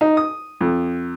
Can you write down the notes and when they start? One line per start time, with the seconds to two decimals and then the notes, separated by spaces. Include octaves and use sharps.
0.01 D#4
0.17 D#6
0.61 F2